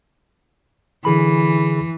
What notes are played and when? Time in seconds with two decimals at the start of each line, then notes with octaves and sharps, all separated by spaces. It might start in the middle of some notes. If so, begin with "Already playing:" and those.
1.05 D3 E3 G#4 B5